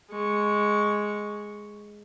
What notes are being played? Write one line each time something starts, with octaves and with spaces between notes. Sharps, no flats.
G#3 C#6